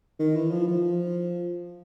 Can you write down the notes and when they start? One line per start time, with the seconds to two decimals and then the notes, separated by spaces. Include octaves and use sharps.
0.19 D#3
0.36 E3
0.51 F3
0.68 F3